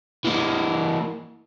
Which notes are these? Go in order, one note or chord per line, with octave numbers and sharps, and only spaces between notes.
E3 A#3